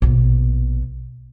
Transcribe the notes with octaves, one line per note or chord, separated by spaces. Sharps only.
A#1 B2